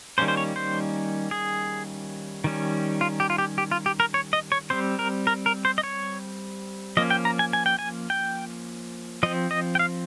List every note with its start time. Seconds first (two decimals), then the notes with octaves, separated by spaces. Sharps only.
0.18 D#3 G3 A#3 C#4 C5
0.28 C5
0.37 C#5
0.56 C5
1.31 G#4
2.44 D#3 G3 C#4
3.01 F4
3.20 G4
3.30 F4
3.38 G4
3.58 G4
3.71 F4
3.86 G4
4.00 A#4
4.14 C#5
4.33 D#5
4.52 C#5
4.70 G3 C4 C5
4.99 A#4
5.27 A#4
5.46 A#4
5.65 C5
5.78 D#5
5.83 C#5
6.97 F3 A#3 C#4 D#5
7.10 G5
7.25 A#5
7.39 G#5
7.53 G#5
7.66 G5
7.79 G#5
8.10 G5
9.23 F3 C4 D#5
9.51 D#5
9.75 G5
9.79 F5